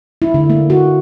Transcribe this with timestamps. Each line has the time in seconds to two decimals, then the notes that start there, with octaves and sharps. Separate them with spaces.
0.22 E4
0.34 D3
0.50 A#3
0.70 F#4